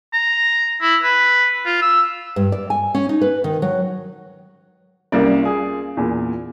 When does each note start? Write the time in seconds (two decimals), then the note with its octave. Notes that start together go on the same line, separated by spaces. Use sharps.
0.13 A#5
0.81 E4
1.03 B4
1.65 F4
1.82 E6
2.36 G2
2.52 D5
2.70 G#5
2.94 C#4
3.09 D#4
3.21 B4
3.44 D#3
3.62 F#3
5.12 C2 A#3 C#4 D5
5.42 F4 G#4
5.97 E2 A#2